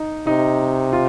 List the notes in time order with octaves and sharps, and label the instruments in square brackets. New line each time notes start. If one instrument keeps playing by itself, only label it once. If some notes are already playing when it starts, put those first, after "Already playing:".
Already playing: [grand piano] D#4
[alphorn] C3 [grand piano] D#4
[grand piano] F4